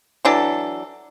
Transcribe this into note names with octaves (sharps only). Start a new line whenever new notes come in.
E3 F#3 D4 A4